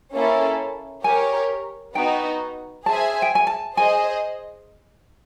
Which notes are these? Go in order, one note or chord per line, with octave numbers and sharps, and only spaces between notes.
A#3 C#4 E4 A4
G4 A#4 C#5 G#5
B3 D#4 F#4 G5
G#4 C5 E5 G#5 A5
G5
G#5
A5
G#4 C5 D#5 G#5